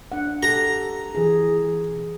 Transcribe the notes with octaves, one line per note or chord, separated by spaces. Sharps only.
D4 F#5
G4 A4 A#5
E3 G#4